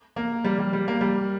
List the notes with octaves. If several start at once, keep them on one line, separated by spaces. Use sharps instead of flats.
A#3
G3
G3
G3
A#3
G3